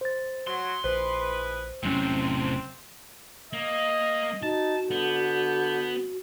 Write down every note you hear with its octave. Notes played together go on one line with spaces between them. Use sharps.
C5 A6
F#3 C6
A#1 E4 G#4 B4 C5
E1 A2 C3 F#3 C4 C#4
A#3 D#5
D#4 F#4 A5
D3 B3 G6